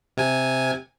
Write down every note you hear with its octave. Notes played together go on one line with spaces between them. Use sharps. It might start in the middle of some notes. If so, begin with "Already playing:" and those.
C3 G#5